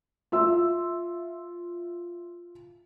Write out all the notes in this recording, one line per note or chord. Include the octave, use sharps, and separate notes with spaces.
F4 E5 E6